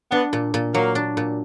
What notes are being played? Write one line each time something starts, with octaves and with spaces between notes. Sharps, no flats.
B3 D4
A#2
A#2
F#3 A#3
D4
A#2